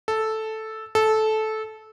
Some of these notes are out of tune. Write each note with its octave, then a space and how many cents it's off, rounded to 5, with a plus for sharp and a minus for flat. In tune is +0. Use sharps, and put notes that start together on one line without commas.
A4 -5
A4 -15